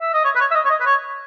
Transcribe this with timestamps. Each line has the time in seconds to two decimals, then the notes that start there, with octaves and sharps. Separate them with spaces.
0.01 E5
0.14 D#5
0.24 C#5
0.36 B4
0.40 C#5
0.51 E5
0.55 D#5
0.65 C#5
0.70 D#5
0.80 B4
0.85 C#5